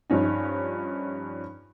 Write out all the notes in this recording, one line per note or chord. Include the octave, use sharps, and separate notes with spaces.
G2 F3 C#4 D#4